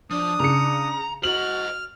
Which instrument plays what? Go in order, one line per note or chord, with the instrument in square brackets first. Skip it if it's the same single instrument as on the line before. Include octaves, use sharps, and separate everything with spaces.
[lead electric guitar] F3 [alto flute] D4 [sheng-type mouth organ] D#6
[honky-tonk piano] C#3 C#7 [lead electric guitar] A#5
[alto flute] F#4 [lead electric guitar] C5 D#5 [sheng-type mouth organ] F6 [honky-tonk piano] F#7